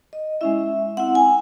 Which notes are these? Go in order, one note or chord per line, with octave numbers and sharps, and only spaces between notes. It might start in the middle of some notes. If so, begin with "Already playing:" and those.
D#5
G#3 C#4 E4 E5
C4 E4 F#5
G#5